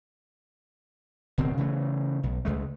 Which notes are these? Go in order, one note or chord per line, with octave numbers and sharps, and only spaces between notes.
D1 B2 D#3 C4
C#3 E3 A3
B1
C#2 G#3 A3